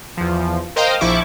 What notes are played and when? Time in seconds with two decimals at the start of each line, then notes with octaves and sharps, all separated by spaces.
0.17 E2 F3
0.76 A#4 C5 D#5 F5 G5 A#5
1.01 A#1 F3 E4 C#6 D6